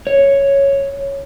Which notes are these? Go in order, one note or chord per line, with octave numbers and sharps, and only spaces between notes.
C#5